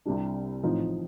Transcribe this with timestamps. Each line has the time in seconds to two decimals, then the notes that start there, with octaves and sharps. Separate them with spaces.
0.06 C2 C3 G3 D4
0.63 A1 A2 F3 C4 D#4